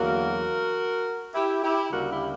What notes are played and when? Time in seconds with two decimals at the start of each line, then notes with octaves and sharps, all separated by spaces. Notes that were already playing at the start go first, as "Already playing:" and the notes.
Already playing: E2 D3 F#3 A#3 F#4 A#4
1.34 E4 G4
1.63 E4 G4
1.91 D2 C#3 G3 A#3 F#4 A#4
2.10 E4 G4